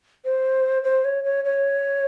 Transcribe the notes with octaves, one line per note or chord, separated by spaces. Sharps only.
C5
C5
C#5
C#5
C#5